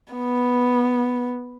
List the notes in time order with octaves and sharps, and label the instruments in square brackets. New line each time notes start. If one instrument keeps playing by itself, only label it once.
[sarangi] B3